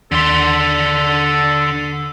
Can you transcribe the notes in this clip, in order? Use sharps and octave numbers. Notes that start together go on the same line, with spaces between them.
D#2 D3 A4 C6 B6